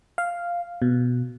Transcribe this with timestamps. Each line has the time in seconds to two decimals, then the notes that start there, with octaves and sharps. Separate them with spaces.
0.18 F5
0.82 B2